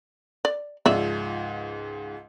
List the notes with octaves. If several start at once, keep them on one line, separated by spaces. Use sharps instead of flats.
D5
C#2 G#2 F3 D5 E5